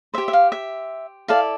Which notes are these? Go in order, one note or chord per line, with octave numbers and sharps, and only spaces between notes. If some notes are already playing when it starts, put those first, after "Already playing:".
G4 C5 E5
E5
F5
E5
E4 A4 D5 F5